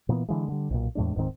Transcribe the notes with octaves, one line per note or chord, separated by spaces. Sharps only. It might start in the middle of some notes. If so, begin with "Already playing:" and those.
A#2 E3 A3 B3
D3 E3 G#3
D3 G3
B1 A#2
E2 A2 G#3 D4
D1 G#2 D#3 C4